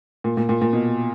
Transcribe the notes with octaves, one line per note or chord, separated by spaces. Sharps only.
A#2
A#2
A#2
A#2
B2